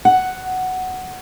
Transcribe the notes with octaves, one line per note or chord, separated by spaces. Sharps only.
F#5